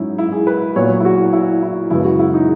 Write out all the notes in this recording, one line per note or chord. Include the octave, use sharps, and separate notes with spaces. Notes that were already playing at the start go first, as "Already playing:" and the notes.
Already playing: G#2 F#3 C#4 D#4 E4
E4
G#4
B4
A#2 F#3 B3 C#5
E4
F#4
E4
E4
F#2 C#3 G#3 B3 E4
F#4
E4
D#4